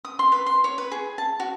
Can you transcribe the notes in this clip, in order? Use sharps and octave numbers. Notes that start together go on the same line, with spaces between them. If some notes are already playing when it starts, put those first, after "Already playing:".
D#6
C6
B4
C6
C#5
B4
G#4
A5
F#4